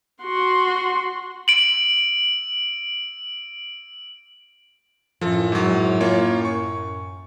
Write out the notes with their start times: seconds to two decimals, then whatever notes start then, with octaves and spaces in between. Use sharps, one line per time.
0.24 F#4 C6
1.48 D7 F#7
5.21 F#2 A2 F3 A4
5.52 G#2 F#3
6.01 A#3 F4 C#5
6.45 C#6